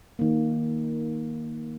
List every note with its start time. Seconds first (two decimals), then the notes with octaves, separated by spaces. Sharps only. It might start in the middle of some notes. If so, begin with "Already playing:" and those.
0.19 D#3 A#3